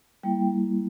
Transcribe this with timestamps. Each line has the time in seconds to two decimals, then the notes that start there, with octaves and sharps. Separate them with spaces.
0.23 G3 A#3 E4 G5